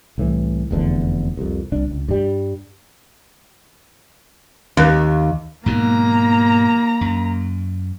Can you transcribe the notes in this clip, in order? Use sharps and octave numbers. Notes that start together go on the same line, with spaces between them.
C2 A2 E3
F1 E2 B2 D3
C2 F2
C2 D4
C#2
G2 G3
D#2
G#2 B2 F#3 A#3 A#5
F#2